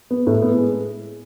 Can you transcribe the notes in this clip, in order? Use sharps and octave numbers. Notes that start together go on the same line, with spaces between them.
B3
A2
B3
G#3